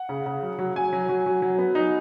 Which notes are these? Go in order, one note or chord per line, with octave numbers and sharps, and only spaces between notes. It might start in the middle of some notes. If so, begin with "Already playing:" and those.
Already playing: F#5
C#3
C#3
F#3
F#3
F#3 G#5
F#3
F#3
F#3
F#3
B3
D#4